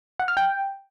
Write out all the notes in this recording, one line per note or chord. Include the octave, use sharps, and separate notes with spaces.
F#5
F6
G5